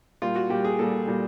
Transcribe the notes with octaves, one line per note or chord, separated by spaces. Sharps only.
A#2 G3 F4
F#4
A#2 G3 G4
G#4
A#2 G3 A4
A#2 G3